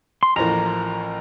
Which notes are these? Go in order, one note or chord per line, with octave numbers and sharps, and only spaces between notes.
C6
A1 A2 F3 A#3 A#5